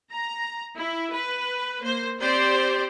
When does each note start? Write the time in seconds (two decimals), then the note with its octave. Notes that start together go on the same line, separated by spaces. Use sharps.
0.11 A#5
0.78 E4
1.13 B4
1.81 A#3 C5
2.21 C4 G4 C5 D5